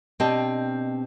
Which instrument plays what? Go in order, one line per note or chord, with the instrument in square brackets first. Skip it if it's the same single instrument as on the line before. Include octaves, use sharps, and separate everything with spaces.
[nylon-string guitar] B2 C4 D4 G4 D#5 A5